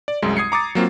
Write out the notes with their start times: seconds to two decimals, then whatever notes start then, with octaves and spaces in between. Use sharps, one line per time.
0.08 D5
0.22 C2 F#2 G#3
0.37 D#6 G#6 C7 C#7
0.52 A#5 D6 D#6 A6
0.75 F#3 A#3 C4 F4